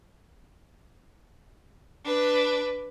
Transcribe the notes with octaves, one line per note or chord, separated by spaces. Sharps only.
D4 B4